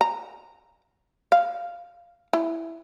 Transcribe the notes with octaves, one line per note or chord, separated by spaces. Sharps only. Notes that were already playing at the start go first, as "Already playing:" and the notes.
A#5
F5
E4